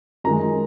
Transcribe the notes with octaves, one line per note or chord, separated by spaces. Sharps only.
F#2 D#3 G#3 A#5